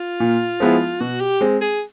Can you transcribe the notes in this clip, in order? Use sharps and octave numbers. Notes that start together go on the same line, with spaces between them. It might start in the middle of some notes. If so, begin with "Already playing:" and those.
Already playing: F4
A#2
F3 G#3 B3 E4
B2 F#4
G4
G#3 C4
G#4